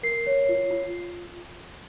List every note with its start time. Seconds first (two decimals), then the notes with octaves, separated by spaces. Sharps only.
0.03 A#4 C7
0.27 C#5
0.49 F4
0.71 F4